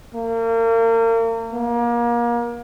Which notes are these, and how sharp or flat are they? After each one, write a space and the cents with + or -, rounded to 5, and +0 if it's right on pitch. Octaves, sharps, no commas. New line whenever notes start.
A#3 -35
A#3 +30